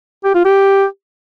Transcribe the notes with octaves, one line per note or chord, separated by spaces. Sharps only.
G4
F4
G4